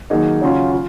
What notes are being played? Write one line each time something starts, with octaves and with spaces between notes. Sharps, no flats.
D#3 F#3 A#3 D#4 G#4
C#3 F#3 C#4 F4
F4